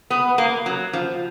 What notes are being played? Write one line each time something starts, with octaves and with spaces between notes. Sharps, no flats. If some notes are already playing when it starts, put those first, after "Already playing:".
B3
A#3
F#3
F3